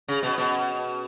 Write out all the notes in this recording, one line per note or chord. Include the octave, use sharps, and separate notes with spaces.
C#3
B2
B2